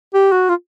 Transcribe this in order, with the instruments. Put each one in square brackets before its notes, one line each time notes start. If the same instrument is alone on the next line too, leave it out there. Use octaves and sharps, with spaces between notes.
[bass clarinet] G4
F#4
F4